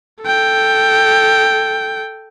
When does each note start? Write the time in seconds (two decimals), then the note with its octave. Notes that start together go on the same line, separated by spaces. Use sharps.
0.23 A4 G5